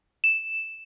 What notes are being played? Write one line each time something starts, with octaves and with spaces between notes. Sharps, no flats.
E7